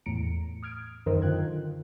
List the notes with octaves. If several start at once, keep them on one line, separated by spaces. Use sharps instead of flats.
E2 A2 A#5 C#7 D7
D#6 F6 G#6 D7
F#2 D#3 A#4 C5 D#5 E6
D3 F4 G5 F#6 G#6